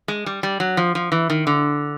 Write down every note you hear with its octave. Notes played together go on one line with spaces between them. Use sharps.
G#3
G3
G3
F#3
F3
F3
E3
D#3
D3